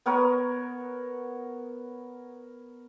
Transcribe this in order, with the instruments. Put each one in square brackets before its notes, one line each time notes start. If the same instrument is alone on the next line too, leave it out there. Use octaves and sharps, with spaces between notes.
[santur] B3 A#4 C#5 F#5